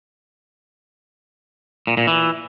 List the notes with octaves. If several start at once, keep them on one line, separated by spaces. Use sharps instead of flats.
A#2
A#2
E3